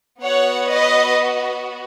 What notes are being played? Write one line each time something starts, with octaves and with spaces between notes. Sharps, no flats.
B3 F#4 C#5 F#5
B4 D#5